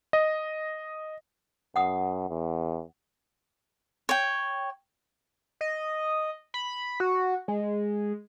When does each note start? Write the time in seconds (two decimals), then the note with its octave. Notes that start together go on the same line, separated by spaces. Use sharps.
0.13 D#5
1.76 F#2 F#5 D#6
2.29 E2
4.09 C#5 G5
5.61 D#5
6.54 B5
7.00 F#4
7.48 G#3